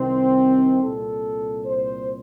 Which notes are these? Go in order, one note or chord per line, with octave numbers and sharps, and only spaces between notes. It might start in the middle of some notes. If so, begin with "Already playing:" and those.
Already playing: C2 C3 D#3 C4
C2 A#2 A4
C5